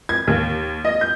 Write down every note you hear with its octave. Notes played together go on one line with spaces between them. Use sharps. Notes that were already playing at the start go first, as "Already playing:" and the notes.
G#6
D#2
D#5
G6